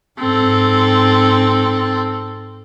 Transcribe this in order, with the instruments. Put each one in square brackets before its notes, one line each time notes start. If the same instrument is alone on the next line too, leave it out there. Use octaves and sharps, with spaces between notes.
[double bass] G#2 [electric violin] C4 A4